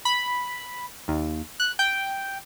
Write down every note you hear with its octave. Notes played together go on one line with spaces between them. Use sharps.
B5
D#2
F#6
G5